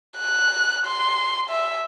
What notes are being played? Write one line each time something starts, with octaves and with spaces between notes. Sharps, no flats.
F#6
C6
E5